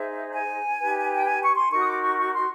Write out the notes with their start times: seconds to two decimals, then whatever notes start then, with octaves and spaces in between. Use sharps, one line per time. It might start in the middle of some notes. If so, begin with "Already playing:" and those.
Already playing: D#4 G#4 C5 E5
0.33 G#5
0.80 D#4 G4 B4
1.14 G5
1.25 G#5
1.42 C#6
1.56 C6
1.71 D#4 F#4 A#4 C#6
1.81 D#6
1.87 D6
2.03 C#6
2.17 C#6
2.33 C6